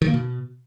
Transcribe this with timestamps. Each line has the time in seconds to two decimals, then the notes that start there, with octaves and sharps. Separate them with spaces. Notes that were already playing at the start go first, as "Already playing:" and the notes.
0.02 D#3
0.08 A#3
0.14 B2